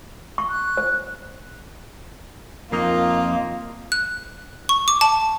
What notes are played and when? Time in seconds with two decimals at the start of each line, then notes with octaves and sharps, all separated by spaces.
0.38 C#6
0.50 F#6
0.77 C5
2.73 F2 A#3 D#4 F4
3.92 F#6
4.69 C#6
4.88 D6
5.01 A5